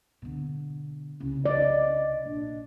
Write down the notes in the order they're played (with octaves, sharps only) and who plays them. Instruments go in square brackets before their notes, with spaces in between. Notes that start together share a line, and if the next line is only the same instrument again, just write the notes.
[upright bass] B2 D3
[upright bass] C2 C#3 [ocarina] C#4
[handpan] D5 [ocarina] D#5
[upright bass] A#1 [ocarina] D4